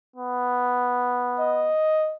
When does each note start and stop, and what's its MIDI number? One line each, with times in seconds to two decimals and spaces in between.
0.16 1.72 59
1.39 2.16 75